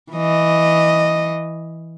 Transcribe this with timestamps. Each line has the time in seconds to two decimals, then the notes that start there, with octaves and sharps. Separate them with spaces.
0.12 E3 D#5